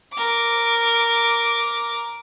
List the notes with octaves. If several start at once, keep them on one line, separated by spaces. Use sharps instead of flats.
A#4 D6